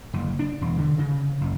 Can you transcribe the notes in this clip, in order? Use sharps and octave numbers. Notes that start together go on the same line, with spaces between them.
F#1
D4
E1
D3
C#3
F#1